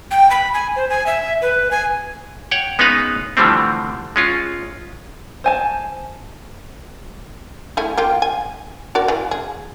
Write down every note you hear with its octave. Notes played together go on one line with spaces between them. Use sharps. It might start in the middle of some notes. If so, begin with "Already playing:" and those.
G5
B5
G#5
C5
G#5
E5
B4
G#5
C#5 F#5 G5
G#3 B3 C#4 D#4 B4 F5
D3 E3 F3 G3 A3 C4
G#3 C#4 F4
C5 G#5 A5
A3 E4 G#4
A#3 F4 G4
G#5
F#4 A#4 D5
E3
G#4